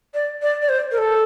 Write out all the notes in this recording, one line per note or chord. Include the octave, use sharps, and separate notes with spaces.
D5
D5
D5
C5
A#4
A4